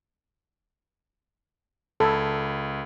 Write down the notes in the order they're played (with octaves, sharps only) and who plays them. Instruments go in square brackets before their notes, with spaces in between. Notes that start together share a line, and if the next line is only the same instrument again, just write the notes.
[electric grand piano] C#2 B5 G#6 [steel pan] A4